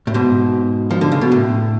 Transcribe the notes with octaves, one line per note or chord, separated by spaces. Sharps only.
A2
G#2 B2
F3
D3
C#3
B2
A2